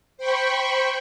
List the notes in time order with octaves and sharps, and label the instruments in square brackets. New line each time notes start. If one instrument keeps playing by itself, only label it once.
[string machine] C5 G5 B5 C#6